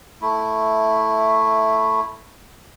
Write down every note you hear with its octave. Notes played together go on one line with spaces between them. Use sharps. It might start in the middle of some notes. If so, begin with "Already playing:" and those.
A3 E4